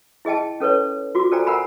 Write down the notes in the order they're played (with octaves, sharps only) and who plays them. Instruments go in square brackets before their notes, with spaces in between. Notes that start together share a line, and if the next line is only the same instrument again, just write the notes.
[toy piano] E4 G#4 D#5 G5 A5
C#4 A4 B4 C#5
F4 F#4 D6
A4 C5 D5 G5 G#5 A#5
A#4 F#5 G#5 A#5 B5